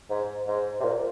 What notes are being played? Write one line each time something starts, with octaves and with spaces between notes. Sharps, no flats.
G#2
G#2
C3
A#2